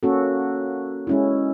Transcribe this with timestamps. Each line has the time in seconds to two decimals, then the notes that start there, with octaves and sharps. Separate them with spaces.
0.03 A#3 C#4 F#4 A4
1.07 G#3 C#4 E4